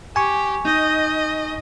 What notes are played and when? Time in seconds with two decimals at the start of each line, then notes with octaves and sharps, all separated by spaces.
0.16 G4 G#5 C#6
0.65 D#4 D#5